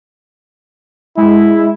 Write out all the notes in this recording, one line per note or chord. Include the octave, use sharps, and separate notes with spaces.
G#3 E4